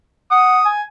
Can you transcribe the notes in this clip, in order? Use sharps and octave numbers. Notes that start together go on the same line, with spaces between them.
F#5 D#6
G#5